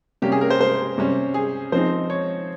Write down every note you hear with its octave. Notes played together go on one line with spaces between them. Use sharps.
C3 G3 A#3 C#4 G4
G#4
A#4
C5
C5
C3 G3 C#4
G#4
F3 C4 D#4 C5
C#5